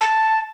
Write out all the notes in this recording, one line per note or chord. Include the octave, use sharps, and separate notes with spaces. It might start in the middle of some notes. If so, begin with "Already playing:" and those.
A5